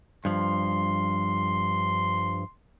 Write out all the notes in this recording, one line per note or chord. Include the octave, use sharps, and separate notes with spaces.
G2 F3 C6